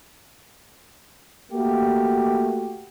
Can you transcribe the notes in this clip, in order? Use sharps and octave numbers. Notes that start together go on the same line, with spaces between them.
A3 A#3 F#4 G4